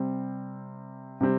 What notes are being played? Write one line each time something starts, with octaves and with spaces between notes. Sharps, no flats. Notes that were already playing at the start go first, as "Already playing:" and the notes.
Already playing: C3 G3 C4
C3 G3 C4